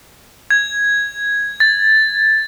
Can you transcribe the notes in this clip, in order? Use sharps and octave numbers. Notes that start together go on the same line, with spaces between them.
G#6
A6